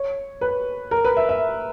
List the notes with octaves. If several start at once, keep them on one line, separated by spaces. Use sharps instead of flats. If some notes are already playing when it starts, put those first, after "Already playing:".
Already playing: C#5
B4
A#4
B4
E5
E5